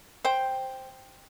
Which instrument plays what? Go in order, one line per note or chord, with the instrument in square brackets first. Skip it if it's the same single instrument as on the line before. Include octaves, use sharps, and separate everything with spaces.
[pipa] C5 G5